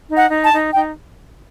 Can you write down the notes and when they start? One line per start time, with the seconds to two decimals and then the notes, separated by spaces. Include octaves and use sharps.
0.09 D#4
0.15 F#5
0.29 D#4
0.44 A5
0.52 D#4
0.73 D#4 G5